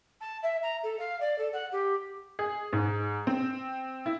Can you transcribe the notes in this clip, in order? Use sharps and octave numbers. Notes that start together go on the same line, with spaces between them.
A5
E5
A#5
A4
F5
D5
A4
F#5
G4
G#4
G#2
C4
E4